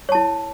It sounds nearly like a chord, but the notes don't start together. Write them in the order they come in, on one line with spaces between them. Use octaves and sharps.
C#5 A5 E4